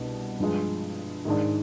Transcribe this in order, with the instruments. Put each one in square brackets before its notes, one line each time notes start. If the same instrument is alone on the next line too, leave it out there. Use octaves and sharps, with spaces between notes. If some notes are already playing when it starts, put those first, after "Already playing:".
Already playing: [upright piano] C2 B2 B3 D4
G2 F3 G#3
G#2 D#3 G#3 D4